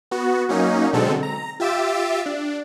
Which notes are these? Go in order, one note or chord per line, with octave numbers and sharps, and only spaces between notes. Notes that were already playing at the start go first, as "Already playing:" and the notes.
B3 F#4
F#3 A#3 C#4 D#4
B2 D3 F#3 G#3 C4 A4
A#5
F4 G4 E5 E6 A6 D7
D4